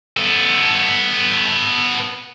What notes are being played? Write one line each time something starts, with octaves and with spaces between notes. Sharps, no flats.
B3 A4